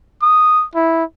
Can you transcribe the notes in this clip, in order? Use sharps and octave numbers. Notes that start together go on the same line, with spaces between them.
D#6
E4